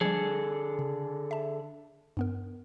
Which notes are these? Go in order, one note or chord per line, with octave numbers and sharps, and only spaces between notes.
D3 F3 G3 G#4 A4
C#3
E5 A5
G2 B3 A#4